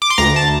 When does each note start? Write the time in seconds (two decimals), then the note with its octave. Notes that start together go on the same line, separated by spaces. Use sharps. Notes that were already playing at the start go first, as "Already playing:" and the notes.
0.02 D6
0.10 C6
0.18 D2 A#5
0.36 A5